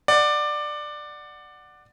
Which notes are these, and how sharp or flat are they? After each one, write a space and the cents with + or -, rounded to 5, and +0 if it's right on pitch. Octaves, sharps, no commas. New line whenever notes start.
D5 +15 F#5 +0